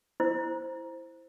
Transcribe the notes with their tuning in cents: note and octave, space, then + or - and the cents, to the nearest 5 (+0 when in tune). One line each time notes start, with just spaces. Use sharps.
E4 +5 C5 +0